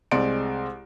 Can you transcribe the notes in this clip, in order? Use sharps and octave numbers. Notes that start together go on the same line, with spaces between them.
C2 G#3 C4 D5 C6 D7